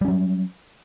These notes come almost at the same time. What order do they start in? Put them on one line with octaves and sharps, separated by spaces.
G3 C#4 F#3